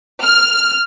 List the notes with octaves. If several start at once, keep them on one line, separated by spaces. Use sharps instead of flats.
F6